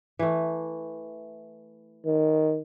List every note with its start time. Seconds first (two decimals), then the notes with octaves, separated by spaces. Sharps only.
0.19 E3 A3
2.06 D#3